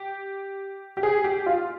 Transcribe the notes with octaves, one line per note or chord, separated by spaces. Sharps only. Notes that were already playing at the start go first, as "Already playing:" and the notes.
Already playing: G4
G4
G#4
G4
F4